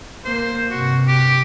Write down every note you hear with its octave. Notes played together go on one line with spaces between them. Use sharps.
A#3 C5
G2 C3 F#4
G4